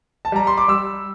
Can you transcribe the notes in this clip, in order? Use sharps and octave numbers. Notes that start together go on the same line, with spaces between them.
A5
G3 A#5
C6
D6
G3 E6